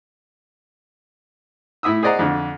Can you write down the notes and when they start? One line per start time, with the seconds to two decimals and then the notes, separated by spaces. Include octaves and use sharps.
1.83 A2 E4 E5 D#6 E6
2.03 G#4 C5 D5 D#5 F#5 A#5
2.19 F2 D3